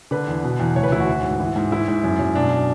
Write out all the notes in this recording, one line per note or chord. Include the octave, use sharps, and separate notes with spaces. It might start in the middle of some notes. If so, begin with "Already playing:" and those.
D3 B4
E2
B2
E2
D2 C#5
B4
D2 E4
F#4
E3
G#2
E3
G#2
E3 E4
G#2
F#2
F#2
B2 D4